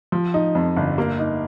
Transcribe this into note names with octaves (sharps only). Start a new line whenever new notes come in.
F3
D#4
F2
G1
A#3
D#4